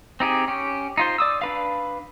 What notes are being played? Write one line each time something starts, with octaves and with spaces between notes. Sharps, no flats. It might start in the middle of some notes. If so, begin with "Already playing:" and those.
C4 D#4 G4 G#4
C#4 G4
D#4 F4 C5
D5 D#6 E6
D4 B4 F5